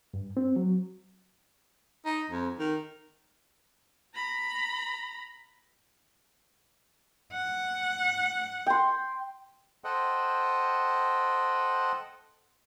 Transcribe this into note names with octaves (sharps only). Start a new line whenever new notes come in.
G2
C4
F#3
D#4
F2
D#3
A#5 B5
F#5
G5 C6
A4 C5 D#5 F#5 G5